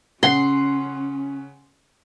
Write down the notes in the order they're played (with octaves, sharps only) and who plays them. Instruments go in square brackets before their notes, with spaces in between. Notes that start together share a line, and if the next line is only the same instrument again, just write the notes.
[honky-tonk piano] C#3 F#5 C7 [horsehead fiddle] C#4 [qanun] C6